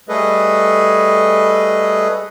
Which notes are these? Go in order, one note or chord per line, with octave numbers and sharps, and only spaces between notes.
G3 A3 G#4 A4 B4 D#5